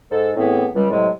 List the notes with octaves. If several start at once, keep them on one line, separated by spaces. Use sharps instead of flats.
G#2 A4
A2 E3 B3 C4 G#4
C#2 G3
A2 C3 F#3 G#3